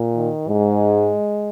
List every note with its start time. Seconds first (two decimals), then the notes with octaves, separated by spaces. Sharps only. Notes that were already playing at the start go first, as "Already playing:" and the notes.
Already playing: A#2
0.15 D#3
0.47 G#2 G#3